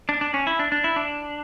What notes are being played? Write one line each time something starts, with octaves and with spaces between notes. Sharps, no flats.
D4
D4
C#4
E4
D4
D4
E4
D4